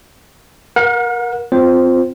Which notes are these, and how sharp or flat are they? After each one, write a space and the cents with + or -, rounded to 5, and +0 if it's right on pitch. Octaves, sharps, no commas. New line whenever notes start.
A#4 +25 F#5 -35
C4 -20 F4 +5 C5 +0